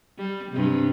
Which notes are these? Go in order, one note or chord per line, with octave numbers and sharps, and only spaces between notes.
G3
G2 C3